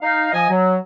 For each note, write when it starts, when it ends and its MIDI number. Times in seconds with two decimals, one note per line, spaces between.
0.01 0.29 63
0.01 0.29 77
0.32 0.47 53
0.32 0.47 75
0.32 0.47 80
0.49 0.77 54